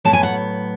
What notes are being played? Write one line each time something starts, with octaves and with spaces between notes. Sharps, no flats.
A2 F#3 B3 E4 A5
G#5
F#5